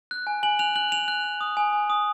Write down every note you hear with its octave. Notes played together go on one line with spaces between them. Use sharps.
F#6
G#5
G#5 F#7
F#6 F7
F#6 F#7
G#5 F7
F#6
F#6
D#6
G#5
G#5
D#6